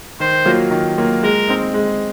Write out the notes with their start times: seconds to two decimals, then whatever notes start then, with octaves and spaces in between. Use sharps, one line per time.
0.20 D#3 C5
0.45 F#3 A#3 F4
0.71 D#3
0.98 F#3 A#3 F4
1.23 G#3 A#4
1.48 C4 D#4
1.74 G#3